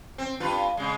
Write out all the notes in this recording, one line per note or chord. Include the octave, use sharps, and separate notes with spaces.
C4
G2 F4 B4
C#3 G#3